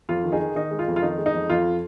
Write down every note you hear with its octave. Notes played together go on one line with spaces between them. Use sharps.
F2 F4
D#3
D#4 G#4
D#3
D#3 D#4
G#3
F4
F2
F4
D#3 D#4
G#3
D#4
F2
F2 F4